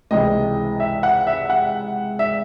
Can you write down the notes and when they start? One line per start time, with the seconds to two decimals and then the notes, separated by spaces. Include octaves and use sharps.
0.11 C#2 C3 E3 G#3 D#5
0.80 E5
1.03 F#5
1.27 E5
1.50 F#5
2.19 E5